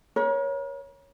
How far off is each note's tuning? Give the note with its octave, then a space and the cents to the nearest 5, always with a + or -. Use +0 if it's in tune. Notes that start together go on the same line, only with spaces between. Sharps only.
A#4 +40 C#5 +0